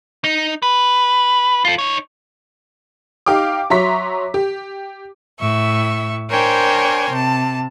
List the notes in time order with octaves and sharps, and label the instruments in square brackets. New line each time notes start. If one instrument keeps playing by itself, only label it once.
[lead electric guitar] D#4
B4
F4 A4
D#4 C#5
[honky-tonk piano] D#4 G4 F5 G5 D6
F#3 E5 A#5 C6 C#6 B6
G4
[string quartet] A2 E5 C#6
D4 A#4 C5 C#5 G5 G#5
C3 A5